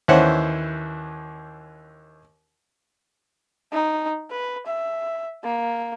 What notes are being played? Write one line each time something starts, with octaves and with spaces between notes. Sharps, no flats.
D#2 E3 C#4 C5 E5 F#5
D#4
B4
E5
A#3